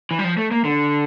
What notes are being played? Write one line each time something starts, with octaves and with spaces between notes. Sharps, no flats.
E3
G3
F3
A3
A#3
D3